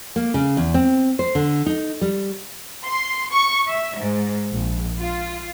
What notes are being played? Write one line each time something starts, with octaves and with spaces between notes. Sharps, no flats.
A#3
C#3
E2
C4
C5
D3
D#4
G3
C6
C#6
E5
G#2
A#1
F4